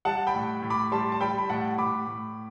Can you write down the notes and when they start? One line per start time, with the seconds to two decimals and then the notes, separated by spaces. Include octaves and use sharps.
0.05 G3 F#5 A5
0.27 G5 B5
0.34 A2
0.62 A2
0.70 B5 D6
0.92 G3 A5 C6
1.12 A5
1.21 G3 G5 B5
1.38 B5
1.49 A2 F#5 A5
1.78 A2 B5 D6
2.07 A2